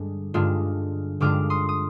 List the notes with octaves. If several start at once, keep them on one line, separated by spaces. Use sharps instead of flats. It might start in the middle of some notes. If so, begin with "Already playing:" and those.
Already playing: G2 D3 G#3 D4
G2 D3 G#3 D4 F4
G2 D3 G#3 D4 F4 D6 F6
C6 D#6
D#6